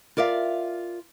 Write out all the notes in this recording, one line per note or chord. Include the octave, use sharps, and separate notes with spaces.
F4 A#4 D5 E5 F5